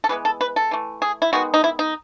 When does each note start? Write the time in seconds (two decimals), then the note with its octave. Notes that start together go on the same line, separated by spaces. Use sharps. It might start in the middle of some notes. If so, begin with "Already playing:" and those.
0.04 A4
0.09 E3 G#3 B3 B4
0.25 A4
0.41 B4
0.56 A4
0.71 E3 A3
1.02 G#4
1.22 E4
1.33 D#3 G#3 B3 F#4
1.54 D#4
1.64 E4
1.79 D#4